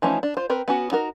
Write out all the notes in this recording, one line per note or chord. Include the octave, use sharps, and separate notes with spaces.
E3 F3 A3 C#4 D#4
D4
F4 C5
C4 A#4 B4
B3 C#4 F#4
D#4 F#4 A#4